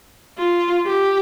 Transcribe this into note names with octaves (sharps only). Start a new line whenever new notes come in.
F4
G4